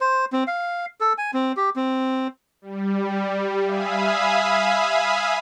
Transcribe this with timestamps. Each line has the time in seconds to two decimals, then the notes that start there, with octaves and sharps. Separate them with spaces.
0.01 C5
0.32 C4
0.47 F5
1.01 A4
1.18 G#5
1.34 C4
1.57 G4
1.76 C4
2.62 G3
3.64 E5 F5 G#5 B5 D#6